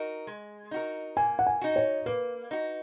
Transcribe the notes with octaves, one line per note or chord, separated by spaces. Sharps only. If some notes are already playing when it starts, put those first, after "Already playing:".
Already playing: D#4 F#4 A#4
G#3
D#4 F#4 A#4
A#3 G#5
F#5
G#5
D#4 F#4
C#5
A#3 B4
D#4 F#4